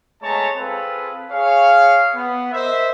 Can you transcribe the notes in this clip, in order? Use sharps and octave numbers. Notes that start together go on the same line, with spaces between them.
G#3 A3 B3 C#5 A5 A#5
C4 F4 G#4 A4 B4
G#4 C#5 F5
B3
A#4 C5 D#5 E5